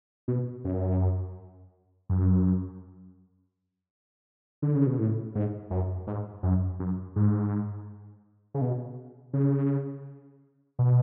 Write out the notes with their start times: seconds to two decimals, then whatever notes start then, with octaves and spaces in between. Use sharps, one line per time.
0.28 B2
0.64 F#2
2.10 F#2
4.62 D3
4.75 C#3
4.87 B2
4.99 A2
5.35 G#2
5.70 F#2
6.07 G#2
6.43 F#2
6.80 F#2
7.16 G#2
8.54 C#3
8.61 B2
9.33 C#3
10.79 B2